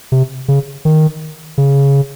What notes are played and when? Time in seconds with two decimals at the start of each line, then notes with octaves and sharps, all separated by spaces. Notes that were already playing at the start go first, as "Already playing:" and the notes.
0.12 C3
0.48 C#3
0.85 D#3
1.58 C#3